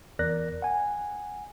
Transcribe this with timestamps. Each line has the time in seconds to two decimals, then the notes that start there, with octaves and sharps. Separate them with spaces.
0.19 E2 A#4 D5 F#6 A#6
0.62 F#5 G#5